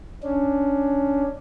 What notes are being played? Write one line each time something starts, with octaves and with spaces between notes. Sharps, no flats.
C#4 D4